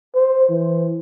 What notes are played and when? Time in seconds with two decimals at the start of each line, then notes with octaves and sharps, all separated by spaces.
0.15 C5
0.49 E3